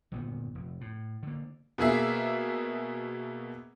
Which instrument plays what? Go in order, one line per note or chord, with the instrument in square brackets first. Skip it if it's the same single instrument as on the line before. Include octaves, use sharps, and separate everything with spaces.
[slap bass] G1 A#2 D#3 B3
F1
A2
D3 A#3
[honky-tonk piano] B2 A#3 G#4 E5